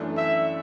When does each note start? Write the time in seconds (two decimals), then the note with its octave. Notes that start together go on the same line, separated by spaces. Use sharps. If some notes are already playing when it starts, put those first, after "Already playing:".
Already playing: F#2 E3 A3 D4
0.17 E5